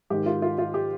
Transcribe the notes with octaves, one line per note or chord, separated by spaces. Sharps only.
G#2 D#3 G4
F4
F4
F4
G4